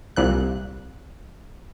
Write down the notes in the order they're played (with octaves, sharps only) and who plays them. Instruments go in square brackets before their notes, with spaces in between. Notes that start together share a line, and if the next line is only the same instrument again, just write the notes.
[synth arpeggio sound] C2 A#2 F#6